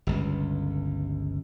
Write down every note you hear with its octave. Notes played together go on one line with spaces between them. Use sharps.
G1 C#2